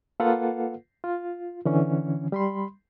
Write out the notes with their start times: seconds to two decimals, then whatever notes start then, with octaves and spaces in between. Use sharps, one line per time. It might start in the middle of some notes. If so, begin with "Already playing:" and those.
0.20 A#3 F4 A4 B4 F5 F#5
1.04 F4
1.65 D3 E3 C#4
2.32 G3 B5 C6